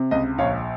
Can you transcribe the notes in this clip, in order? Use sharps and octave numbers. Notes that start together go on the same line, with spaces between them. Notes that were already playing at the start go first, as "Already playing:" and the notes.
Already playing: C3
C#2 D#5
A#1 C#5 F5